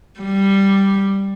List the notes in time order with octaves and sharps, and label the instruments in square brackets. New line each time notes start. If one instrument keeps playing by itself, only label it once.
[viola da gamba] G3